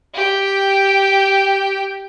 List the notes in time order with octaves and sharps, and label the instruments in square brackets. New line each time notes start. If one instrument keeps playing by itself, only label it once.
[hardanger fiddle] G4 G5